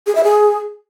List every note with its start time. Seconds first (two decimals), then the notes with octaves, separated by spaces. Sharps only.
0.07 G#4
0.15 E5
0.24 G#4